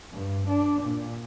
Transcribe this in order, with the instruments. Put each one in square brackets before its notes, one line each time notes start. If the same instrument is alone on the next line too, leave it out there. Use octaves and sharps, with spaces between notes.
[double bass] G2
D4
A#2